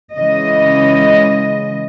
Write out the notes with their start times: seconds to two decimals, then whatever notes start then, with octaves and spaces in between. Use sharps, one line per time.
0.17 C#3 E3 G#3 D#5